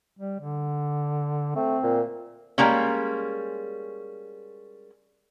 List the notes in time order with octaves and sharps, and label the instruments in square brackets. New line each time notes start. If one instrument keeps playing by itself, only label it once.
[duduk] G3
D3
[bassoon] A3 [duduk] C4
[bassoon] A#2
[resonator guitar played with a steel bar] G3 G#3 A#3 C#4